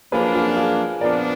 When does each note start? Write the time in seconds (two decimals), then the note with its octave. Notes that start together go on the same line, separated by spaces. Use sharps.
0.12 F#2 F3 A#3 D4 G#4 B4
0.35 F4 G#4
0.56 F4 G#4
1.01 A#2 F3 B3 D4 A#4 D5